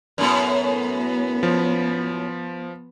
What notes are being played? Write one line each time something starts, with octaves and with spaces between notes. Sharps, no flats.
F#2 A2 B3
F3